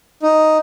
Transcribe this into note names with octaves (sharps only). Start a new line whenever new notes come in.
D#4